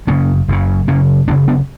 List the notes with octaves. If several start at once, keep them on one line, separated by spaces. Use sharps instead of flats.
F#1 F#2 C#3 A#3 C#4
F#1 F#2 C#3
F#1 F#2 C#3 A#3 C#4
F#1 F#2 C#3 B3 D4
B3 D4